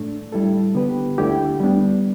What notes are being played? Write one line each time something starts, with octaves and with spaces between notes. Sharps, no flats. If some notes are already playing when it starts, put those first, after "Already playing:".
Already playing: A2 A3 D4
G3 E4 A4
D3 B3 G4 B4
D2 D3 A3 E4 G4
G3 B3 D4